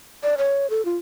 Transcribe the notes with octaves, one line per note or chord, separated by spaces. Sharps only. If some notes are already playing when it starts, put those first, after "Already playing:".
D5
C#5
A4
F4